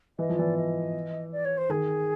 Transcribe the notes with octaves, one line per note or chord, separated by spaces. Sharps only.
E3 D#5
F3
E3 D5
D#5
D5
C#5
C5
D#3 G#4